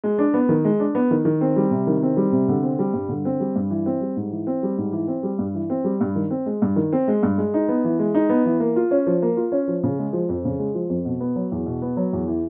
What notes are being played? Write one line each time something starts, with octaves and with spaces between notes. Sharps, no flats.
G#3
D4
B3
D#3
G#3
D4
B3
D#3
D#3
C4
G3
C3
D#3
C4
G3
C3
D3
C4
G3
G2
D3
C4
G3
G2
E3
C4
G3
G#2
E3
C4
G3
G#2
E3
C4
G3
G2
E3
C4
G3
G2
D#3
C4
G#3
G2
D#3
C4
G#3
G2
G#3
D#4
B3
E3
G#3
D#4
B3
E3
A#3
F4
C#4
F3
A#3
F4
C#4
F3
C#3
G#3
F3
F2
C#3
G#3
F3
F2
B2
B3
F#3
E2
B2
B3
F#3
E2
E3